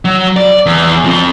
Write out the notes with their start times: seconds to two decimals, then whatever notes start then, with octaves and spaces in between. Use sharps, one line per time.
0.05 F#3
0.37 D5
0.66 E2
1.04 F3 C4